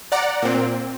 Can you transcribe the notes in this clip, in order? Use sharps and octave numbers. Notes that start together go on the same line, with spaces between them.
D5 F#5 A#5
A#2 C4